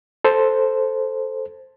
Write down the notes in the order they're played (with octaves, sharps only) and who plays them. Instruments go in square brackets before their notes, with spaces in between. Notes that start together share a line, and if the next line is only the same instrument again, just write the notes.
[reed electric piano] A4 C5